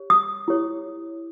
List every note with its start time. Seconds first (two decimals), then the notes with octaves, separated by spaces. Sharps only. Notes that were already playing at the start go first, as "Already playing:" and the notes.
Already playing: G4 C#5
0.10 D#6
0.48 E4 G4 C#5